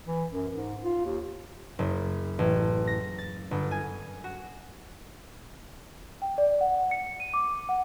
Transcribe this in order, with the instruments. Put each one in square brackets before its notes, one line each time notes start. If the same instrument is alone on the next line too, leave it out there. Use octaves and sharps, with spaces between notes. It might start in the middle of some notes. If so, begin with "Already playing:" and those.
[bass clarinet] E3
F#2
G#2
F4
D#2
[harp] F#1
A1
A#6
A6
G1
G#5
F#4
[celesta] G5
D5
F#5
C#7
D#7
D6
F#5